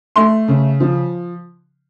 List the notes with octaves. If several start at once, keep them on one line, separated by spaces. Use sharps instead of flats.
A3 C6
C#3
F3